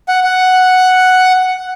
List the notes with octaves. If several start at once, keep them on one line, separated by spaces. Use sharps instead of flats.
F#5
F#5